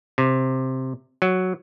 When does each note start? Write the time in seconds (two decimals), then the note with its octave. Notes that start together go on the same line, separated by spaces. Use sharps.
0.18 C3
1.22 F#3